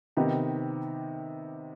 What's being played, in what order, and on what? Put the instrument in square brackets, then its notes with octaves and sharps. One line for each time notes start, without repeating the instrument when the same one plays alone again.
[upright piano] C3 D#3 B3 D#4 G4